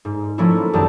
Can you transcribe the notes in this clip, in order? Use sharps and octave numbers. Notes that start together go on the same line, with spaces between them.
G#2
F3 A3 A#3 C#4 E4
C2 F#2 D#3 G3 A5